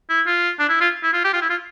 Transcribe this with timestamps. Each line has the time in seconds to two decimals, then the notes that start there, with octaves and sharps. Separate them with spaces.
0.10 E4
0.26 F4
0.59 D4
0.69 E4
0.81 F4
1.03 E4
1.13 F4
1.24 G4
1.33 F4
1.41 E4
1.50 F4